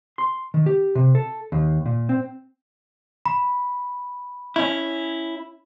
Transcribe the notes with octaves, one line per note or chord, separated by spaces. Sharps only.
C6
D#3
G4
C3
A4
D#2
A#2
C4
B5
C#4 E4